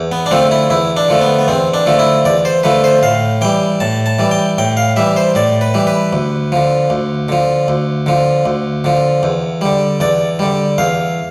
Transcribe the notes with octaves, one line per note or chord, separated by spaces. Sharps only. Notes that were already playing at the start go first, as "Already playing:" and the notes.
Already playing: E2
B3
D4
D3 F3 A3 C4
E4
E2 E4
D4
D3 F3 A3
B3
B3
E2 C4
D4
D3 F3 A3
E4
E2 D5
C5
D3 F3 A3 B4
C5
A2 F5
E3 G3 G5
A2 A5
A5
E3 G3
G5
A2 G5
F5
E3 G3 E5
C5
A2 D5
B4
E3 G3
B4
D2
D3 F3
D2
D3 F3
D2
D3 F3
D2
D3 F3
E2
D3 G3
E2 D5
D3 G3
E2 F5